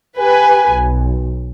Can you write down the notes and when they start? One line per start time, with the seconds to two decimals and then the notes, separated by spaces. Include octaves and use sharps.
0.18 G4 B4 G#5
0.71 B1